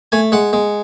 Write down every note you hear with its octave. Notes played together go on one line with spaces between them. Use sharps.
A3 G#5
G#3 F#5
G#3